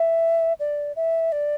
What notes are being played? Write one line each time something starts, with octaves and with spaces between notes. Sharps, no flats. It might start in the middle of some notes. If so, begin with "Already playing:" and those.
Already playing: E5
D5
E5
D5